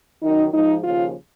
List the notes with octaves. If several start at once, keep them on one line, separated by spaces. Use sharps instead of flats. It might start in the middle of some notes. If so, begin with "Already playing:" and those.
F#2 D#3 D#4
G#2 F3 D#4
D#2 C#3 F3 F4